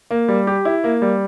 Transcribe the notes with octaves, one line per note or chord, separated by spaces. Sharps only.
A#3
G3
G4
E4
A#3
G3